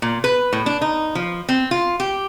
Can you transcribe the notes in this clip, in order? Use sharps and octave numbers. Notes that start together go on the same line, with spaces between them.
A#2
B4
A2
D4
D#4
F3
C4
F4
G4